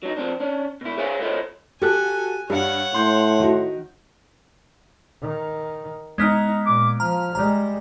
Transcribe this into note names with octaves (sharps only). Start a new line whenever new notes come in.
F#3 D4 D#4
F3 C4 D4
C#4 D4
B2 E4
G#4 C5 C#5 E5 F5 G#5
E4 F4 A4 C5 C#5 D#5
F#4 G4 A4 G#5 F#6
G2 G3 C#5 F5 F#5
A2 C6 G6
D#3 F#4
D#3
G#3 B3 D#4 F6
A#2 D6
F3 A#5 F6
G3 G#3 A#5